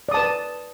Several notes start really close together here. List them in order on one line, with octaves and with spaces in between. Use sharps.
D5 D#6 A5 B4